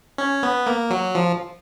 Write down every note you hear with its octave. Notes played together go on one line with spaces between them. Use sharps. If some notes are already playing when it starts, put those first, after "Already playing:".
C#4
B3
A#3
F#3
F3